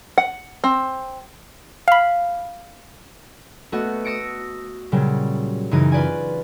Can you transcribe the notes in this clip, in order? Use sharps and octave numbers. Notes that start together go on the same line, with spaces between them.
F#5
C4
F5 B5
A3 B3 F#4 D#5
D#6 E6 A#6 C#7 D7
A#2 C#3 F#3 G3
F#2 C#3 E3 D#4 D#7
F4 B4 D5 G#5